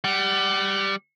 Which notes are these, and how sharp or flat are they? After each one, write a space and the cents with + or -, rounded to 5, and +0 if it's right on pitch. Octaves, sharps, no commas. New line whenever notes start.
G3 +0 F#5 +35